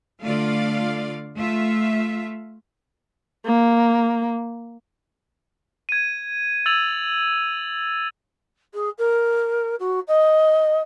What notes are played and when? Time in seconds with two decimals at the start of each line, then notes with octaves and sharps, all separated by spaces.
0.24 D3 A3 F4 D5 F5
1.35 A3 F4 E5
3.46 A#3
5.89 G#6 D#7
6.66 E6 G#6 A6 F7 F#7
8.74 G#4
8.98 A#4
9.79 F#4
10.07 D#5